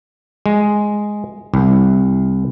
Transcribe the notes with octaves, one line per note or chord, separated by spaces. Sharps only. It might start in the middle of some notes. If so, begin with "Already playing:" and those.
G#3
C2